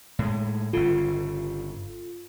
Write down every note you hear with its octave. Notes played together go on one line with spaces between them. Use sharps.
A2 G#3
G1 C#3 F4 A4